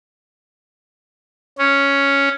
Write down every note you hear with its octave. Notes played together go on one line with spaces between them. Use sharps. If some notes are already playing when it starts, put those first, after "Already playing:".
C#4